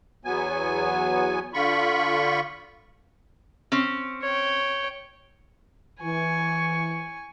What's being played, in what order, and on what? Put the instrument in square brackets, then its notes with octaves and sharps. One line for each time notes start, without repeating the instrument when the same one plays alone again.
[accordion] E2 F#3 B3 G#5
D3 F4 B5 C#6
[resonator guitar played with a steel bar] C4 C#4
[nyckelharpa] C#5 G5
[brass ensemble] E3 [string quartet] G#5 C#6